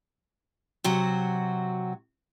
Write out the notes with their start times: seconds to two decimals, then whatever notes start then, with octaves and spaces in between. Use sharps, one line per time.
0.84 C3 F#3 F#4